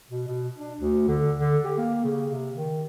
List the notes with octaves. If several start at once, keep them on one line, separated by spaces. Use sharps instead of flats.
B2
B2
D4
D2
D3
D3
G4
A#3
C#3
C3
D#3